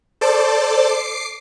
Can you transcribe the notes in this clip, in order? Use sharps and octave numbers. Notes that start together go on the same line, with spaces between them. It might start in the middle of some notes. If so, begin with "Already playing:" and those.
A4 C5 D5 A5 D6
D6 C7